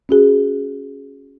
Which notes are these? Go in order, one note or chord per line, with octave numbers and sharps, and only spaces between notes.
C#4 F#4 G#4